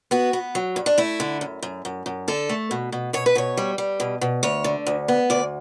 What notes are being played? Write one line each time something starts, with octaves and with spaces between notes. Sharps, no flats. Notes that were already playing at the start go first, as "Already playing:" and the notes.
B3 F#4
B3
F#3
G2
D4
A3 E4
D3
F#2
F#2
F#2
F#2
D3 A4
A3
B2
B2
B2 C#5
B4
B2 C#5
G3
G3
B2
B2
D2 C#5
D3
D2
B3
D2 D5